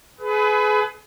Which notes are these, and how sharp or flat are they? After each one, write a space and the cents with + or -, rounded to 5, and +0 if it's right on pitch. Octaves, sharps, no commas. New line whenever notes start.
G#4 +30 B4 +20